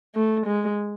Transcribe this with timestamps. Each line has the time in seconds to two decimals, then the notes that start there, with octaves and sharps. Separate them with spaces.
0.15 A3
0.46 G#3